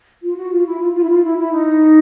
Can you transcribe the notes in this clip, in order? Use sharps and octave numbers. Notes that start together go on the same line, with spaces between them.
F4
F#4
F4
E4
F4
F4
E4
F4
E4
E4
D#4